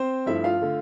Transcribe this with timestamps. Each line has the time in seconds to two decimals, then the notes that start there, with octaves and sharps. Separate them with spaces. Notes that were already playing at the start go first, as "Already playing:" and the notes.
Already playing: C4 C5
0.26 G2 F3 A3 E4 E5
0.44 F4 F5
0.61 D3 A3